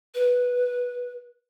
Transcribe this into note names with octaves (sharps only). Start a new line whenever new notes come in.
B4